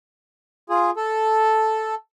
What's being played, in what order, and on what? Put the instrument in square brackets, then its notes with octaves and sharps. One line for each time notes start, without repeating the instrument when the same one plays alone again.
[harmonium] F4 G#4
A4